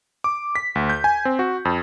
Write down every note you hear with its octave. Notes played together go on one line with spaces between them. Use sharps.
D6
B6
D2
G6
G#5
C4
F#4
F2